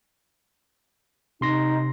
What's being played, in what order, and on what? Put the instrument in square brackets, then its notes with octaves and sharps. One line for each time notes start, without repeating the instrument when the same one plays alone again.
[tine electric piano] C3 C6 A#6 [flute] D#4